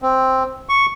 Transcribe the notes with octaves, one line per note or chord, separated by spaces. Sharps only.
C4
C#6